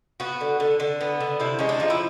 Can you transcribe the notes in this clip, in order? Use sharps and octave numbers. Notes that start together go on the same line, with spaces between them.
B3 F#4
D3
D3
D3
B3
D3
C3 E4
G#3 C#4
D4
F3 D#4
E4